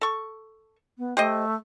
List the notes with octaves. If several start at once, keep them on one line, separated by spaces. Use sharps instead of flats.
A4 C#6
B3
A3 G4 C5 D#5